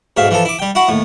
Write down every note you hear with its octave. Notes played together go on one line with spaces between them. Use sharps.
B1 G#2 E5 F5
E3 F3 A4
E4 D6
G3 G5
E4 F#4 F#5
D#2 A2